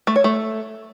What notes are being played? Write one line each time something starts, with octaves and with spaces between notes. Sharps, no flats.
A3
C#5
A3